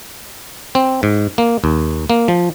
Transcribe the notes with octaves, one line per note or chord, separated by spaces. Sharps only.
C4
G#2
A#3
D#2
A#3
F3